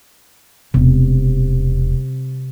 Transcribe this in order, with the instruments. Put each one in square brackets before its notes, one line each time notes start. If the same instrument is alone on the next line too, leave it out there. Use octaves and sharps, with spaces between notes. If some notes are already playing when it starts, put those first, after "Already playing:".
[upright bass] E1 [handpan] C3